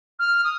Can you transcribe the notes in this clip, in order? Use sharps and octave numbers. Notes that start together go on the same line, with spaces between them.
F6
D#6